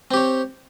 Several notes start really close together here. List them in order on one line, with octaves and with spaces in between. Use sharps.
C4 G4 C#5